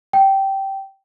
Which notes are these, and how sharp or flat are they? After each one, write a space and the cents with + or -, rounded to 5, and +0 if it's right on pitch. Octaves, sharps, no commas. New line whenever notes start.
G5 -15